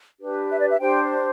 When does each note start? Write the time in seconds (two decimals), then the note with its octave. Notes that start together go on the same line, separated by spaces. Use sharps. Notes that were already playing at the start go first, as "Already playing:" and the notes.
0.20 D4 G4 B4
0.50 E5
0.60 D5
0.70 E5
0.80 D4 G4 C5 G5